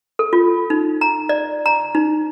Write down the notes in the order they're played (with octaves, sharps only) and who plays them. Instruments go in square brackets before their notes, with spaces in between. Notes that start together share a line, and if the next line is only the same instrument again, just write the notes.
[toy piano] A4
F4
D#4
A#5
D5
A#5
D#4